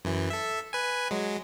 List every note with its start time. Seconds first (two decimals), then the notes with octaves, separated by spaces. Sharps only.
0.05 F#2 E3
0.30 A4 E5
0.73 B4 G#5
1.11 F#3 G#3